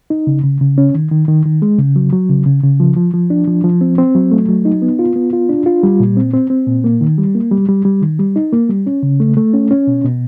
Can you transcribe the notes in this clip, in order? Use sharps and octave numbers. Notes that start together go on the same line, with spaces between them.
D#4
C#3
C#3
C#3
C#4
D#3
D#3
D#3
D#3
G#3
C#3
F#3
F#3
C#3
C#3
C#3
F3
F3
F3
D4
F3
F3
C4
C4
F#3
A3
F#3
D#4
B3
F4
B3
F4
D4
F4
G3
A#2
C4
C4
C4
A#2
A#3
D#3
G3
A#3
G3
G3
G3
D#3
G3
D#4
A#3
G3
C#4
C#3
A3
A3
C#4
C#4
B2
B2